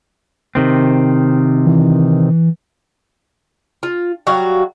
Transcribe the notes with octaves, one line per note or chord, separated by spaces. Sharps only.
C3 D#3 C4
E3
F4
F#3 G3 F#4 F5